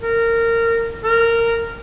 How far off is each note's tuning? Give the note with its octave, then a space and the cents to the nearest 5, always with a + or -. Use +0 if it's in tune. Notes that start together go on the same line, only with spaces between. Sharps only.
A#4 -20
A#4 -15